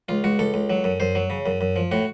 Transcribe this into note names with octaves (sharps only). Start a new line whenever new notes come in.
C#2 F4
C#2 F#4
C#2 A4
C#2
F#3
F#2
F#2 C5
F#3
C#3
F#2
F#2
F3
A2 F#4